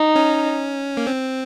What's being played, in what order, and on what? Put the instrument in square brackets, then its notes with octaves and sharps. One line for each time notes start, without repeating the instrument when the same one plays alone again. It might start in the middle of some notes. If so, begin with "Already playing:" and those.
Already playing: [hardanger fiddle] D#4
[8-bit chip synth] C#4
A#3
C4